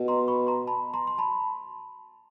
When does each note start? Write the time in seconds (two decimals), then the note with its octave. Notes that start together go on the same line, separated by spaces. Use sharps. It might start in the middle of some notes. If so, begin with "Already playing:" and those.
Already playing: B2
0.08 A#5 C6
0.28 B5 C#6
0.47 A#5 C6
0.67 A5 B5
0.94 A#5 C6
1.07 C6
1.18 A5 B5